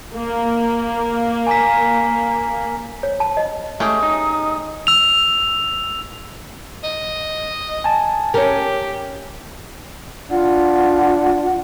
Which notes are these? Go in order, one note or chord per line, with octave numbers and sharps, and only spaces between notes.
A#3
G#5 A#5 B6
C#5
A5
D#5
G#3 A3 C#4 G4 D#6
D#4
E6 F7
D#5
G#5 A5
C#4 G4 A#4
D4 F4 F#5